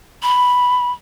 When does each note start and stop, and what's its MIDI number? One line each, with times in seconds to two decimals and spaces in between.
0.23 0.92 83